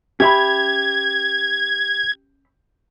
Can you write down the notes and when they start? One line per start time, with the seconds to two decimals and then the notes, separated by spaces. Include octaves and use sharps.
0.20 C#4 G4 E5 B5 G#6